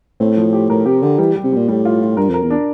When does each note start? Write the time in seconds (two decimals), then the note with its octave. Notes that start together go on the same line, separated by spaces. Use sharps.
0.20 A2 C4
0.37 F3
0.53 G4
0.70 A2 A#4
0.86 C3 G4
1.03 D3 G4
1.18 E3 G3
1.36 G3
1.44 C3
1.52 A#2 G3
1.68 A2 G3
1.85 F4
2.02 F4
2.17 G2 A#4
2.30 F2 A#4
2.42 E2
2.50 D4